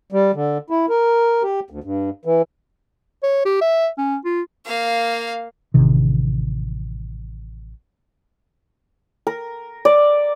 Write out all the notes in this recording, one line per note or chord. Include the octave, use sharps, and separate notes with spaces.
G3
D3
E4
A#4
G4
D2
G2
E3
C#5
G4
E5
C#4
F4
A#3 F5
A1 C3 D#3
A#4
D5